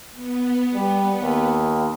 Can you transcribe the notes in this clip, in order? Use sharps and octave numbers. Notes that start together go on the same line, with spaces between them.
B3
G3
D#2